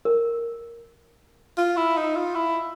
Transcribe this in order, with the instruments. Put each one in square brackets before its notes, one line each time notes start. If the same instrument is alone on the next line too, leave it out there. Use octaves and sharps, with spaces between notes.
[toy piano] A#4
[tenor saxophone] F4
E4
D#4
F4
E4